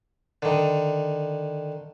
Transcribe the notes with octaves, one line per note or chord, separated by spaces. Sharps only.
D3 D#3